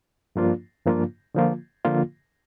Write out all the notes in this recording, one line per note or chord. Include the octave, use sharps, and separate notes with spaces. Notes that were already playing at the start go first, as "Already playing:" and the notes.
G2 F3 A#3 D4 F4
G2 F3 A#3 D4 F4
D3 F3 A#3 F4
D3 F3 A#3 F4